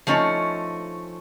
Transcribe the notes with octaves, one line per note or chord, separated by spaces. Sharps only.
F3 A3 C#4 D#4